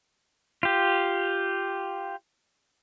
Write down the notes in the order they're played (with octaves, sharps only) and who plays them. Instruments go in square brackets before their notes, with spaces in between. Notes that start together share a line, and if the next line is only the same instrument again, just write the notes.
[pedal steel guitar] F4 G4